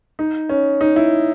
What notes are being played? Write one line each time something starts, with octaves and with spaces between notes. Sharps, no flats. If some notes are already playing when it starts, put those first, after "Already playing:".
D#4
C#4
D#4
E4